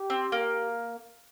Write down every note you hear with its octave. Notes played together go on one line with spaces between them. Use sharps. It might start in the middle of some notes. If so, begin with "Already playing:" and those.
Already playing: G4
C4
A#3